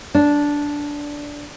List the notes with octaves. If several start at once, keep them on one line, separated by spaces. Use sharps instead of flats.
D4